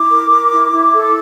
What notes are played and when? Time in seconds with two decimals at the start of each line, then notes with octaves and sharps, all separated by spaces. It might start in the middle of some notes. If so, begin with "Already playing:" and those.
Already playing: E4 D6
0.10 A#4
0.31 A#4
0.52 E4
0.72 E4
0.93 A4